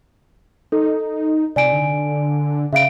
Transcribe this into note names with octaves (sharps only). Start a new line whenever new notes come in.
D#4 A4
C3 D5 G#5 D7
D3
C#3 E5 F5 D7